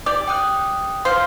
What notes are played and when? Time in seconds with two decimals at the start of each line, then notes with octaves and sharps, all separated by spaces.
0.06 G4 D5
0.28 G5 D#6 F#6
1.05 C5 F5 F6